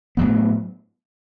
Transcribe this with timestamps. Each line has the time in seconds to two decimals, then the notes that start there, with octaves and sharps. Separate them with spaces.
0.17 A2 F#3 B3